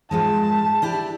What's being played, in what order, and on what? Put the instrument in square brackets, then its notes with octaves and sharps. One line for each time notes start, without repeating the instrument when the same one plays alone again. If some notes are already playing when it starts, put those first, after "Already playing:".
[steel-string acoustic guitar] G#2 F3 G#3 [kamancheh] A5
[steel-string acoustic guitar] D4 E4 G4